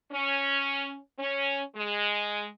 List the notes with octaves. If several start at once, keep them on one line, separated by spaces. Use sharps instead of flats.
C#4
C#4
G#3